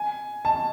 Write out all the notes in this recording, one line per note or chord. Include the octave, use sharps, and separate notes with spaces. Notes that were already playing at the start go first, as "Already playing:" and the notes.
Already playing: G#5
A5